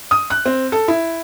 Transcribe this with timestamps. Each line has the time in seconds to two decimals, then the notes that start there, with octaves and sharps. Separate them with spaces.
0.11 D#6
0.30 F#6
0.46 C4
0.72 A4
0.88 E4